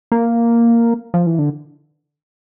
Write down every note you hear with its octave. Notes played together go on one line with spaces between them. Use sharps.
A#3
F3
E3
D3